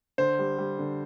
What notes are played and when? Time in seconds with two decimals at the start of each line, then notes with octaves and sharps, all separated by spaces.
0.18 D3 C5
0.39 G3
0.58 G3
0.79 D3